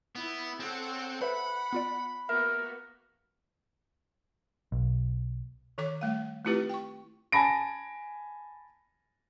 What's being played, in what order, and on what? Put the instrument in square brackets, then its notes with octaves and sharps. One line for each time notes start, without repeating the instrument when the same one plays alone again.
[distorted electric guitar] B3 [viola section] E4
[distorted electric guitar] C4 [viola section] A4 C#5 F#5
[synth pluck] B4 C5 E5 [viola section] F#5 [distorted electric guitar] B5
[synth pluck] B3 F4 D5
[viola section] A#3 B3 F#4 [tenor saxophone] A#4 [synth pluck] E5
[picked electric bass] B1
[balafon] D#3 A4 C#5 D6
G3 A3 F5
A3 C4 E4 F4 G4 B4
G5 C#6
[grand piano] G#5 A5 B5 A#6 D7